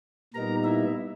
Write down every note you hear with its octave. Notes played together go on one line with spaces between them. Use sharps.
A#2 G3 B3 D#4 A#4 A#5
E4 E5